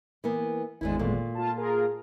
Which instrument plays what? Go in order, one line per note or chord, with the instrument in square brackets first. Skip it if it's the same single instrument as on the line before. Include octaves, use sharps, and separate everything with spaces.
[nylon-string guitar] E3 A#3 B3
[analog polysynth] G#1 E2 G#3 [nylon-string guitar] D3 E3 E4
[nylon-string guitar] A#2 A3
[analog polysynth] F4 A5
F4 G#4 A#4